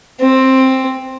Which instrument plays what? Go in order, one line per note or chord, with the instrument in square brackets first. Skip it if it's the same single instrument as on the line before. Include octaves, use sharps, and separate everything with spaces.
[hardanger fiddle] C4